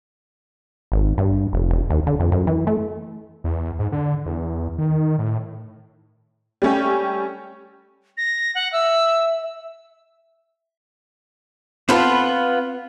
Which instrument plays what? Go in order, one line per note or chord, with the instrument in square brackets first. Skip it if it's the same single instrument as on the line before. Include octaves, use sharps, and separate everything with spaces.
[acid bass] G#1
G2
F1
E1
D#2
D3
F2
F#2
E3
A3
[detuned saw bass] E2
G#2
D3
E2
D#3
A2
[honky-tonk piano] G3 A3 C#4 G4
[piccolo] A#6
F#5
[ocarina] E5 [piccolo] E6
[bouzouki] B3 F4 [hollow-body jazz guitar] C4 A4 F5